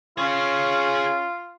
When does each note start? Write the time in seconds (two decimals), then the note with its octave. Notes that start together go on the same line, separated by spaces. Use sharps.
0.18 C#4 F4 G#4 F5